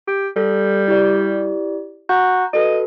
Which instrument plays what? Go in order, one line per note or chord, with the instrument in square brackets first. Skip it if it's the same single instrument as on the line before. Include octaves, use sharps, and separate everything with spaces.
[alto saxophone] G4
[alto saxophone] G3 [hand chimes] A4
[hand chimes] E4 G4 D5
[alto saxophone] F#4 [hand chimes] A#5 G6
[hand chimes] F#4 A4 B4 [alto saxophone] D#5